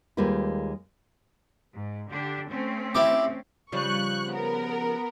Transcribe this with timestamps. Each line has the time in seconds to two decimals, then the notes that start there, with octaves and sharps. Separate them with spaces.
0.17 D#2 G3 G#3 A#3 F4 B4
1.74 G#2
2.10 D3 D4 G4
2.49 A3 C4 C#4
2.95 E4 G4 D6
3.72 C#3 F3 G3 C#6 F#6
4.31 B3 A#4